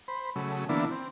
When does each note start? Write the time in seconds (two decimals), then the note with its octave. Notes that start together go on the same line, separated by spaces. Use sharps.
0.08 C5 B5
0.36 C#3 F#3 A3
0.69 D3 E3 A#3 B3 D4 E4
0.91 C4